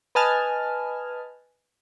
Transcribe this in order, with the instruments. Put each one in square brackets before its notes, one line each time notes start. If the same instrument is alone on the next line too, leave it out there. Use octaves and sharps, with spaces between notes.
[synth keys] B4 D#5 G#5 A5 F6